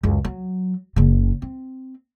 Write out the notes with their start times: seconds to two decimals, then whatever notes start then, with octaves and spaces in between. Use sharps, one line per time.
0.03 C#2 F#2
0.25 F#3
0.96 F#1 C#3
1.42 C4